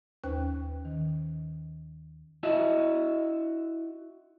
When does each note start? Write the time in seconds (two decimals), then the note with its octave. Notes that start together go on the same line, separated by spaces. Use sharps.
0.24 D#2 C#4 B4 C5 G5 F#6
0.85 D#3
2.43 E4 F#4 D#5 E5